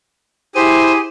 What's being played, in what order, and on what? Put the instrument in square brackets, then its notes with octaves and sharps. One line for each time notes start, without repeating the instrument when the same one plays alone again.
[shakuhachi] E4 [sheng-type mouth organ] G4 G#4 [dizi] C5 [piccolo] D#7